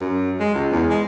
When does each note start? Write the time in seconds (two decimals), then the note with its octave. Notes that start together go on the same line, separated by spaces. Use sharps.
0.01 F#2
0.40 G#3
0.54 C#2
0.72 E2
0.89 G#3